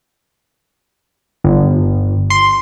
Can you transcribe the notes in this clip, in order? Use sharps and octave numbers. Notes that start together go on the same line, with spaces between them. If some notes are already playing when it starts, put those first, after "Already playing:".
G1
C6